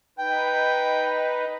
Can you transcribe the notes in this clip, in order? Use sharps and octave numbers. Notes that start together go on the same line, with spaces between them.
D#4 B4 G5